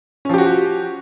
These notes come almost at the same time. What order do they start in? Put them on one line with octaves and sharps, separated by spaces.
C#4 F3 G4 F#4